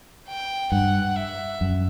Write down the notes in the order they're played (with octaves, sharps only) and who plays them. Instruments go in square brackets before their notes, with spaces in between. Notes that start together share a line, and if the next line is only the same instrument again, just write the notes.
[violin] G5
[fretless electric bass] G2 [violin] F#5
[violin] E5
[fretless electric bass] F#2